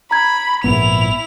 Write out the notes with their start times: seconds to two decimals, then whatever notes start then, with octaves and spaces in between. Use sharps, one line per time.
0.11 A#5 B5 G#6
0.64 A#1 G#2 B3 E4 F7